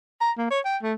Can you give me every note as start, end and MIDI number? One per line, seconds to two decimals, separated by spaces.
0.21 0.32 82
0.38 0.47 58
0.51 0.60 73
0.65 0.77 79
0.82 0.94 57